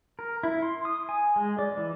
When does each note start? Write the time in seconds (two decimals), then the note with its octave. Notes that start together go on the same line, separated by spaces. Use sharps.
0.19 A#4
0.43 E4
0.62 C6
0.85 D#6
1.09 G#5
1.36 G#3
1.59 D5
1.77 E3